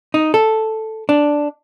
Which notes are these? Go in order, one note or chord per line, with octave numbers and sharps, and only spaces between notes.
D#4
A4
D4